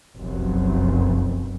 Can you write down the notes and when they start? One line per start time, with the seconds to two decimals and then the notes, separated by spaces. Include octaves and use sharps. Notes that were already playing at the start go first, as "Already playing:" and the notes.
0.17 F1 B1 F#2